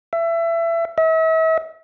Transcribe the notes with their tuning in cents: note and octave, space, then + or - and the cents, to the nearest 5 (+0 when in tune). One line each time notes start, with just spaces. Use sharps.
E5 +25
E5 -40